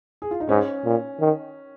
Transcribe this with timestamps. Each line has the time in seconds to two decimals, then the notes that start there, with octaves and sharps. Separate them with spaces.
0.22 G#4
0.31 F4
0.40 D#4
0.49 G#2 C#4
0.85 A#2
1.20 D#3